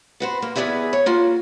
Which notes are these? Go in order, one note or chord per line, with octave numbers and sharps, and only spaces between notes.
B3 F#4 C5
A#3
E2 B3 G#4 D5 E5 G#5
C#5
A#3 F4 F#4